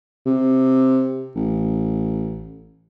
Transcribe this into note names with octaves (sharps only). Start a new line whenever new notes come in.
C3
A1